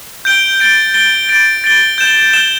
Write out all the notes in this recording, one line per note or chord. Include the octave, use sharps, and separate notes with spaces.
G6 D7 G7
A6 D7 G7
A6 D7 G7
A6 D7 G7
A6 D7 G7
G6 E7 G7
G6 E7 G7